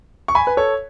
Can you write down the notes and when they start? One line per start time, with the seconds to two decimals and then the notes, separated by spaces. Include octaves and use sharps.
0.28 C#6
0.35 G#5 B5
0.47 B4
0.57 A4 C#5